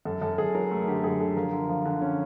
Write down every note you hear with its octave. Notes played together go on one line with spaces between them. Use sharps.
F#2 A4
F#2 A4
F#2 G#4
F#3 A#4
A3 A4
D3 G4
F#2 G#4
D3 A4
F3 A#4
D3
F3
D3
C#4